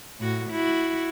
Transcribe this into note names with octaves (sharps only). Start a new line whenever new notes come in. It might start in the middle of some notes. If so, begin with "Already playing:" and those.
A2 F#4
E4 F#4